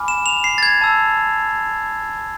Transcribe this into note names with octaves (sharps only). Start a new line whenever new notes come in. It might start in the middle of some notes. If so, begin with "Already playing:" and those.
Already playing: G#5 B5 D6 F6
E7
F7
C7
A6
G#6
A5 E6